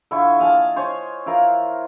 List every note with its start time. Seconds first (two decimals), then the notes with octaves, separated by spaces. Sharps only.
0.11 D3 E4 F4 C#6
0.39 D#5 F5 G#5 A5
0.76 C5 C#5 G#5 C6
1.26 E4 F4 A#4